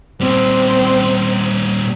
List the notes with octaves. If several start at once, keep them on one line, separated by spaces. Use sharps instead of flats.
A#2 G3 C4